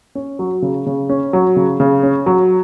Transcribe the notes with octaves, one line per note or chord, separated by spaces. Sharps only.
C#4
F#3
C#3
C#3
C#4
F#3
C#3
C#3
C#4
F#3